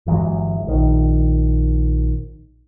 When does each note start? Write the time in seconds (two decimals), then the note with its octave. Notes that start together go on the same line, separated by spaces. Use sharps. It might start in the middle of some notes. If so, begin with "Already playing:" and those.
0.06 G1 E3 F#3 G#3
0.67 A#1 D#3